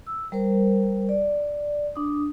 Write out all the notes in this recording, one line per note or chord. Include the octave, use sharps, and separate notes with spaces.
E6
G3 A#4 C5
D5
D4 D#6